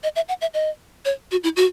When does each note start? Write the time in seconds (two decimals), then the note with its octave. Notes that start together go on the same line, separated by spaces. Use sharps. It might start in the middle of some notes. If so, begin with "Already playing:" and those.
0.03 D#5
0.16 E5
0.28 F#5
0.41 E5
0.54 D#5
1.05 C#5
1.31 F#4
1.44 E4
1.56 F#4